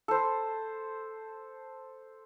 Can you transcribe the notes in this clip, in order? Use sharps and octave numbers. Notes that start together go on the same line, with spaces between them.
A4 C5